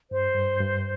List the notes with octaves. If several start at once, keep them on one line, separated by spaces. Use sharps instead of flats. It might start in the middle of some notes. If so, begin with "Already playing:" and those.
G2 C5
G2
G2